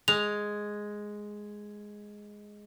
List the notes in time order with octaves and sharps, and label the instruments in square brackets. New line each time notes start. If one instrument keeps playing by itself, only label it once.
[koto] G#3 [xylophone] F7